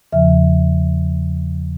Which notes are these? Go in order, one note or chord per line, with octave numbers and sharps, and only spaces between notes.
E2 C#3 F3 E5